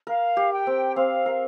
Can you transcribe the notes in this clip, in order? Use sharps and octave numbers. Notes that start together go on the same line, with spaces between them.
A#4 F5
G4
G5
C4
C4 F5
A#4